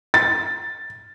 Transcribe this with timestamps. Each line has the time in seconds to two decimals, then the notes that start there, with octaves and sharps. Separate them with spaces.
0.14 A6